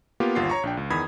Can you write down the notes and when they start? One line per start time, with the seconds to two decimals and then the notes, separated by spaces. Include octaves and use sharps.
0.20 A#3 B3 F4 G4
0.35 G1 D#2 F4 F#5 C7
0.50 C#5 A#5 C#6
0.63 A#1 D4 G5
0.77 C#2
0.90 E2 D#3 B5 D#6 G#6